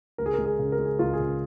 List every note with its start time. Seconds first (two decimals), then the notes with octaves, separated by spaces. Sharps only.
0.18 C#2 A#4
0.26 G#4
0.33 A#4
0.38 G#3
0.46 G#4
0.59 C#3
0.72 A#4
0.78 G#3
0.85 G#4
0.99 C#2 F4
1.13 G#4
1.20 C#3